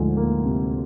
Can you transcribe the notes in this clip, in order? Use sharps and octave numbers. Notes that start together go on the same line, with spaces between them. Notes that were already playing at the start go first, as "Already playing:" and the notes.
Already playing: D2 G#2 F3
A#3
C3